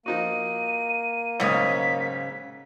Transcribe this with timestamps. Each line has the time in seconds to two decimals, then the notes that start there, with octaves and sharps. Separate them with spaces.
0.06 F3 A#3 D#4 F#4 D#7
1.40 B1 G#2 C#3 C#5 F5 D#6 B6